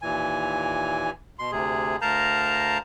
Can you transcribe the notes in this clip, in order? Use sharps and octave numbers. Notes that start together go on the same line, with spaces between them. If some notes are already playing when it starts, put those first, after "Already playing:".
D#2 A#2 E3 G#5
B2 C6
D2 C3 G#4
D2 A#4 F5 A5 A#5 G6